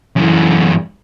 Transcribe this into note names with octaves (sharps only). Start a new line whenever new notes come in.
F#2 E3